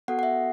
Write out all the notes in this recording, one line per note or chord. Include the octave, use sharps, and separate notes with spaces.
B3 F#4 A4 F#5
F#5
E5